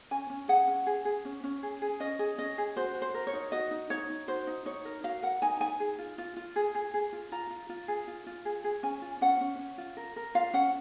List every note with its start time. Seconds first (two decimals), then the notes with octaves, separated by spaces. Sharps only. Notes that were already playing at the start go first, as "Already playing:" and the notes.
0.11 C#4 G#5
0.30 C#4
0.48 G#4 F#5
0.67 C#4
0.86 G#4
1.05 G#4
1.25 C#4
1.44 C#4
1.63 G#4
1.82 G#4
2.00 C#4 D#5
2.19 G#4
2.38 C#4 D#5
2.58 G#4
2.76 F#4 C5
2.95 F#4
3.02 C5
3.14 A#4
3.27 C#5
3.33 D#4
3.52 F#4 D#5
3.71 D#4
3.90 D#4 C#5
4.10 D#4
4.28 F#4 C5
4.47 D#4
4.66 D#4 C#5
4.85 A#4
5.04 F#4 F5
5.22 A#4 F#5
5.42 D#4 G#5
5.60 D#4 G#5
5.80 G#4
5.98 F4
6.18 F4
6.36 F4
6.56 G#4
6.75 G#4
6.94 G#4
7.13 F4
7.32 F4 A#5
7.50 F4
7.69 F4
7.88 G#4
8.08 F4
8.27 F4
8.45 G#4
8.64 G#4
8.83 C#4 G#5
9.02 F4
9.21 C#4 F#5
9.41 C#4
9.59 C#4
9.78 F4
9.97 A#4
10.16 A#4
10.35 F4 F5
10.53 C#4 F#5